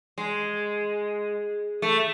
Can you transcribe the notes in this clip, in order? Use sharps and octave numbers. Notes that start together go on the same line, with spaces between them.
G#3
A3